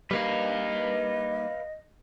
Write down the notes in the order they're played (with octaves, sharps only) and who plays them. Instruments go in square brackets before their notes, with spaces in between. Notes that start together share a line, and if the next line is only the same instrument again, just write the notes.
[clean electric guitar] G3 A#3 D#4 [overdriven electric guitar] B4 F5 [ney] D#5